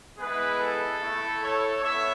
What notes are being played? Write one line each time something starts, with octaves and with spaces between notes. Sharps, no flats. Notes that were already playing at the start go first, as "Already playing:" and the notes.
G#3 B3 E4 G#4 B4
A4
A3 E4
A4 C#5
B3 C#5 E5